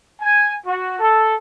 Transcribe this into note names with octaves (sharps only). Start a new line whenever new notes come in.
G#5
F#4
A4